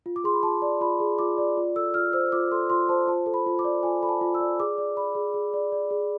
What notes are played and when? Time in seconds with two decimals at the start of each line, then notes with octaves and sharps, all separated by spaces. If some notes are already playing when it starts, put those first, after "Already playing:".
0.06 F4
0.16 D6
0.24 G#4 C6
0.34 B5
0.43 F4 A5
0.62 D5
0.81 F4 B5
1.00 G#4
1.19 F4 D6
1.38 D5
1.57 F4
1.76 A4 E6
1.94 F4 F6
2.13 C5 E6
2.32 F4 D6
2.51 A4 C6
2.70 F4 C6
2.89 C5 A5
3.07 F4 A5
3.26 A4
3.34 B5
3.46 F4
3.59 D6
3.64 D5
3.83 F4 G#5
4.02 A4 B5
4.09 A5
4.21 F4
4.34 E6
4.40 D5
4.60 G#4 D6
4.78 D5
4.97 D5 B5
5.15 G#4
5.34 G#4
5.54 D5
5.72 D5
5.91 G#4